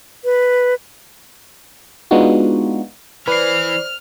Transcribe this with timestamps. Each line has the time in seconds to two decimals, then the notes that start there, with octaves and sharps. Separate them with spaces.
0.24 B4
2.11 G#3 B3 D4 D#4 F4 F#4
3.28 E3 B4 C5 D5 F6 C7